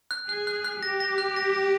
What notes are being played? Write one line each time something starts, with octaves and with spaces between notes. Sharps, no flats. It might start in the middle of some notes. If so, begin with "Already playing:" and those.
F#6
G#4 F#6
F#6
F#6
G4 A#6
A#6
F#6
A#6
A#6